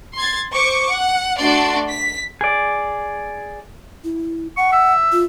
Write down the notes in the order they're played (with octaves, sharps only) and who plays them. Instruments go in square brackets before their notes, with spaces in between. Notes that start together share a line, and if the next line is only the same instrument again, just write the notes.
[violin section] C6 G#6 A6
C5 C#6 D6
F#5
A3 D4 F#4 D5 C6
B6
[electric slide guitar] G#4 D5
[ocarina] E4
[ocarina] F#5 [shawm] C#6
[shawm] E5
[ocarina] F4